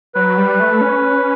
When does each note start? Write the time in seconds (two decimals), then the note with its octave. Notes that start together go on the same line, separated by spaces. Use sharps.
0.15 F#3 B4
0.38 G3
0.60 A3
0.81 C#4